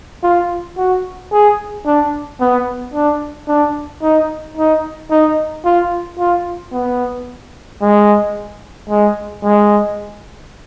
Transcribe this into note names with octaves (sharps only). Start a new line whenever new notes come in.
F4
F#4
G#4
D4
B3
D4
D4
D#4
D#4
D#4
F4
F4
B3
G#3
G#3
G#3